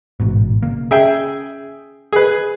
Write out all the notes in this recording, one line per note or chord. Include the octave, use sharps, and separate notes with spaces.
A1 G#2 B2
C#3 A#3
C#4 G#4 E5 G5
G#4 B4